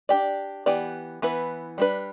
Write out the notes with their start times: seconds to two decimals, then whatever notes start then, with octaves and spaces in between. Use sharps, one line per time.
0.09 D4 G4 D5
0.66 E3 B3 G4 D5
1.22 E3 B3 E4 B4
1.78 G3 D4 B4